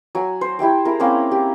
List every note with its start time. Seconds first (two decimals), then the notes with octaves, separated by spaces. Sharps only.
0.15 F#3 G#5
0.41 C5
0.59 E4 G4 E5 G5
0.85 E4 G#4 A#4
1.00 A#3 C4 C#4 A#4
1.31 G4